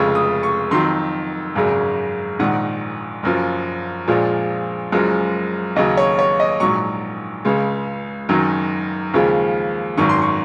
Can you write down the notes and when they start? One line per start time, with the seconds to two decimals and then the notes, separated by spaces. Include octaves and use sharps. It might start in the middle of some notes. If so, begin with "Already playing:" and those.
Already playing: F1 F2 C#3 G#3 C#6
0.15 D#6
0.43 C#6
0.71 F2 D#3 F#3 C6
1.56 G#1 F#2 C#3 G#3
2.39 A#1 G#2 D#3 F#5
3.23 F#1 F#2 F3
4.07 A#1 A#2 F3 G#3
4.92 F#1 F#2 F3 G#3
5.76 D#2 C#3 F#3 D#5
5.97 C#5
6.19 C#5
6.40 D#5
6.60 A#1 G#2 F#3 C#6
7.45 C#2 C#3 G#3
8.29 F#1 F#2 D#3 F#3
9.13 D#2 C#3 F3 G#3
9.97 G#1 F#2 D#3 C#6
10.09 C6
10.22 C#6